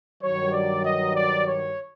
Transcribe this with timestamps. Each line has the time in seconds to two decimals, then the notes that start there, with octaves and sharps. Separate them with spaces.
0.22 G2 D#3 F#3 C#5
0.52 D5
0.85 D#5
1.16 D5
1.48 C#5